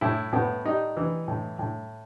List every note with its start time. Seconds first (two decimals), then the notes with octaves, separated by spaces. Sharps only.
0.01 A2 E4
0.33 A2 B3
0.65 G3 D#4
0.97 E3
1.28 A2
1.59 A2